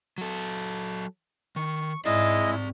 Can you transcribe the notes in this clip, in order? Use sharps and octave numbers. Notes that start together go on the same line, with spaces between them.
F#3 A4
D#3 C#6
G#2 G#3 C4 E4 D5 D#5